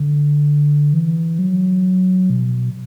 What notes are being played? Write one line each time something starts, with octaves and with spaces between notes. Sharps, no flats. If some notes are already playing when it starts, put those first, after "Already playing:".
Already playing: D3
E3
F#3
B2